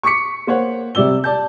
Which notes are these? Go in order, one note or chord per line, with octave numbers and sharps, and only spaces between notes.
C#6 D6 B6 C#7
A#3 C5 C#5 F#5
C3 G3 D5 E6 G7
D5 A5 G6